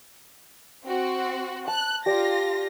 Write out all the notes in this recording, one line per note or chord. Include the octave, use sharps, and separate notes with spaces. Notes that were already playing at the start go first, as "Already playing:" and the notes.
C4 F#4
A5 F#6
F4 G4 D5 A#6